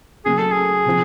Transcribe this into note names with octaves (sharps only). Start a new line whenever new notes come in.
C#3 F#3 A#3 G#4
A4
G#4
C3 F3